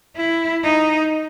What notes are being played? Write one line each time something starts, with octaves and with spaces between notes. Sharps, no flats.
E4
D#4